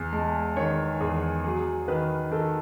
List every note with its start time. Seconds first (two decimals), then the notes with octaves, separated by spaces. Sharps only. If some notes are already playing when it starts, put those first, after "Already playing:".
Already playing: E2 G#5
0.12 G#3 A5
0.57 D#3 C#5
1.00 E2 G#4
1.44 F#3 G#4
1.88 D#3 B4
2.31 D#3 A4